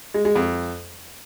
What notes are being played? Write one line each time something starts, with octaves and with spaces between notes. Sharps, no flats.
G#3
G#3
F2